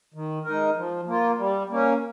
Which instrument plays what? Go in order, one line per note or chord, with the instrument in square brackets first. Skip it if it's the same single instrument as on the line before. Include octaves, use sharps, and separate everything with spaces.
[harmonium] D#3
G#3 D#4 A#4
F3
A#3 F4
G3
A#3 C#4